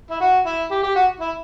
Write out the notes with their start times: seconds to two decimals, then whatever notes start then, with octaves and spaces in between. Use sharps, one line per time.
0.10 E4
0.21 F#4
0.46 E4
0.71 G4
0.83 G4
0.95 F#4
1.20 E4